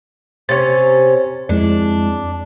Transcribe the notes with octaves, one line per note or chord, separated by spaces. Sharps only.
C3 C#4 A6
F2 G#3 D4 E4